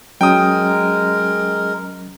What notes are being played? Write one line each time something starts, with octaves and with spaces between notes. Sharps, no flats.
F#3 G#3 C#4 A#4 G5 D#6